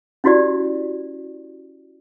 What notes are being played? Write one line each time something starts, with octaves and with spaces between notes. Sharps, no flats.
C#4 E4 F#4 G4 D5